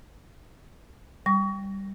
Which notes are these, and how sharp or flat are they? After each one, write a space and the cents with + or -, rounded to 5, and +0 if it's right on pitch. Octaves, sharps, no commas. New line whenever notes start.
G3 +0 C#6 +30